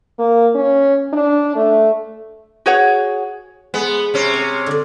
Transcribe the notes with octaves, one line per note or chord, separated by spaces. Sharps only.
A#3
C#4
D4
A3
F#4 G#4 C#5 F#5
G#3 B3
C3 C#4
C4
D3 D5